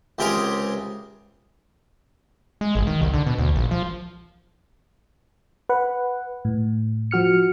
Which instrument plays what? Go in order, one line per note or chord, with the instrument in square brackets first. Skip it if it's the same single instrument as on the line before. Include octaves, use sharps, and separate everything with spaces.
[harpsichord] C#2 C3 G4 G#4 A#4 A#5
[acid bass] G#3
G#1
D#3
C2
D3
B2
D2
A#1
F3
[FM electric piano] B4 F#5
A2
F3 F#4 F6 C#7